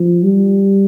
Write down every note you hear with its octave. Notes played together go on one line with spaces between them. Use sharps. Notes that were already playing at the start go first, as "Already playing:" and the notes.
Already playing: F3
G3